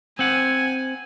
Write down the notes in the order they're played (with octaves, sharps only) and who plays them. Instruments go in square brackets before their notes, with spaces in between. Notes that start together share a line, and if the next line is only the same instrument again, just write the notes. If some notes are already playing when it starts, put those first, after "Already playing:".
[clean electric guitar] C4 F#5 [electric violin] G#5